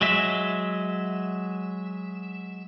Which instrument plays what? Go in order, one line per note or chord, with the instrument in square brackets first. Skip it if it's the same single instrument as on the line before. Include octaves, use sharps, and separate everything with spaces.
[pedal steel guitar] F#3 G#3 E5